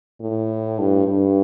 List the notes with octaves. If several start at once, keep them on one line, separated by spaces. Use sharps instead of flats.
A2
G2
G2